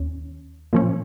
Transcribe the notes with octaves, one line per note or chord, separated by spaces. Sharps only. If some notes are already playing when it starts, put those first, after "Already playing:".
Already playing: D#2 C#4
A#2 F3 C#4